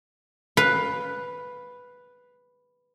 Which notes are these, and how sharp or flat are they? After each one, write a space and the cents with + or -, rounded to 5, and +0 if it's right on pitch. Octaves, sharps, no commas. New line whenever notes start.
B4 +0 F5 +15